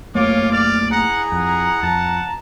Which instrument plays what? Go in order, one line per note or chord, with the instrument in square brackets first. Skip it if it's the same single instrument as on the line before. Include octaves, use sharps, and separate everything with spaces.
[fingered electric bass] F#2 A3 A#3 [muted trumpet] F4 [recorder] C#5 [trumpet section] F5 D6
[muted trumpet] D5 [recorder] F6
[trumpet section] E4 G#4 [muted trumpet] F#5 [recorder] A#5
[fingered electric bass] F2 [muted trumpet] F#5
[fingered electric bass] F2 [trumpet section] A5